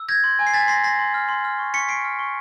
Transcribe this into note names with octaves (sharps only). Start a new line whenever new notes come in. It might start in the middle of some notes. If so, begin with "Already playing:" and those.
Already playing: E6
G6 G#6 A#6
C6
G#5
C7
G#5 A6 B6
C6 A#6 C7
C6 A#6 C7
C6
F6
C6
F6
C#6
C#6 B6 C#7
C#6 C7 D7
F6
C#6